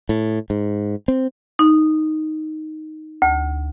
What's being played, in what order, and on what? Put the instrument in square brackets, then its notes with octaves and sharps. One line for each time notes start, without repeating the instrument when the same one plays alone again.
[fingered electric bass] A2
G#2
C4
[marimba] D#4
D2